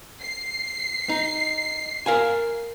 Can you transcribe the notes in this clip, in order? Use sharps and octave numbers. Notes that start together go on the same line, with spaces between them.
C7
D#4
A#4 F5 G#5